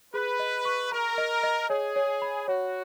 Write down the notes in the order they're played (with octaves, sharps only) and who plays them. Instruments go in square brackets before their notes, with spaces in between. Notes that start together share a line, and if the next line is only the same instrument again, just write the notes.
[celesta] G#4 [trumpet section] B4
[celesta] D#5
C#6
[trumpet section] A#4 [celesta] A#5
[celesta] D#5
D#5
[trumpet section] G#4 [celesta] C#5
[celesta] C#5
B5
[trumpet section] F#4 [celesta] C#5